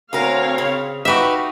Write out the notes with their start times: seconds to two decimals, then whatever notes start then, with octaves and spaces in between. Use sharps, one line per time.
0.13 D2 D3 C4 A#4 C#5 F5
0.58 C#3
1.05 D#4 F#4 G4 B4 E5 F5